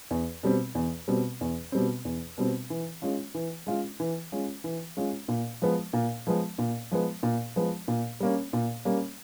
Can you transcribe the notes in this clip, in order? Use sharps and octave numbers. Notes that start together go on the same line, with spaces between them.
E2
B2 G3 C4
E2
B2 G3 C4
E2
B2 G3 C4
E2
B2 G3 C4
E3
G#3 C#4 F4
E3
G#3 C#4 F4
E3
G#3 C#4 F4
E3
G#3 C#4 F4
A#2
F3 G#3 B3
A#2
F3 G#3 B3
A#2
F3 G#3 B3
A#2
F3 G#3 B3
A#2
G3 A#3 C#4
A#2
G3 A#3 C#4